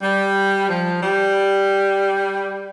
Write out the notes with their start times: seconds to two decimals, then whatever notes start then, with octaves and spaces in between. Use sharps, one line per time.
0.03 G3
0.69 F3
1.02 G3